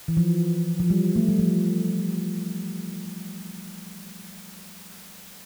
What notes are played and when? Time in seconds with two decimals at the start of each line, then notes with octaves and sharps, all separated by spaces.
0.08 E3
0.17 F3
0.80 F3
0.90 G3
1.16 A3
1.28 G3
1.39 F3